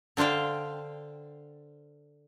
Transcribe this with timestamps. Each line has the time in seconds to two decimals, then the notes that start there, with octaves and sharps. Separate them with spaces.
0.17 D3 D4 C5 F5 G5